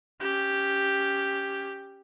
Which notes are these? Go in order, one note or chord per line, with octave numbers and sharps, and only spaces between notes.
C#4 G4